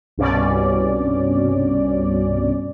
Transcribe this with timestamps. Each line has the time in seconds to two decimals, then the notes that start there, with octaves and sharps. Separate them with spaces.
0.18 C2 G2 B2 C#4 D5